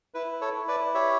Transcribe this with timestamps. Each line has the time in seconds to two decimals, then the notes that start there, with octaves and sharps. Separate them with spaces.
0.14 E4 B4
0.41 A4 C#5
0.54 E4
0.68 B4 D5
0.94 G4 C#5 E5